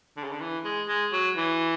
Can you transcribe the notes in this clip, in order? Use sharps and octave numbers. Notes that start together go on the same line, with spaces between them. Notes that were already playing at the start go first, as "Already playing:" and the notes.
D3
C#3
D3
E3
G#3
G#3
F#3
E3